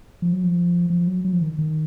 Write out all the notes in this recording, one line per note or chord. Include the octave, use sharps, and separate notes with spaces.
F3
F#3
F3
F3
F#3
F#3
F3
D#3
D#3